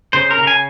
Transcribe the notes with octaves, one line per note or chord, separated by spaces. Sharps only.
C#3 C5
A#4
C#3
G#5